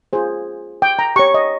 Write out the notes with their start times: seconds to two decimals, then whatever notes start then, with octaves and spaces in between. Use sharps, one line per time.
0.13 F4 G#4 C5
0.82 G5
0.99 A#5
1.16 G4 C#6
1.19 C#5
1.34 D#5